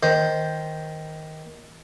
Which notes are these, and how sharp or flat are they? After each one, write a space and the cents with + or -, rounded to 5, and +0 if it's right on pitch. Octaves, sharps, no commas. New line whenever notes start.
D#3 +10 C5 +0